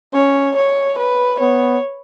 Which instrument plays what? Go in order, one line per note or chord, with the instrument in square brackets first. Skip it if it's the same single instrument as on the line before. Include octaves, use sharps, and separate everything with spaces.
[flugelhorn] C#4 [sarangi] C#5
[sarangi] C#5
B4
[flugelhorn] B3 [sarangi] C#5